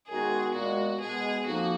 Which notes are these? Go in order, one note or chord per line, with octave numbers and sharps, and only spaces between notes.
F#2 D#3 G#3 B3 F#4 G#4
A#2 G#3 B3 F#4
B2 G#3 B3 G#4
F2 F3 A#3 D#4 F#4